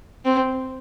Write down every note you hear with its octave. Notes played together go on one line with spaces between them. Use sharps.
C4